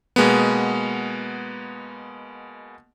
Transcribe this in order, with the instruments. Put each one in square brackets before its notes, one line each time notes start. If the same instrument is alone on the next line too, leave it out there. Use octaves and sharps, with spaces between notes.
[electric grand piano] B2 G#3 A#3 B3